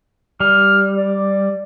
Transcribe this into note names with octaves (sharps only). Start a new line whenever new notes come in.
G3 F6
D5